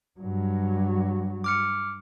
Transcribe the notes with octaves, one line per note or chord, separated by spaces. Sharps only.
G2 F#3
D6 F6 C#7